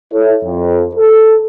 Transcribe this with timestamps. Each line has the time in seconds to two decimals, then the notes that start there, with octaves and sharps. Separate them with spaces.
0.13 E4 A4 C#5
0.45 F2
0.95 A4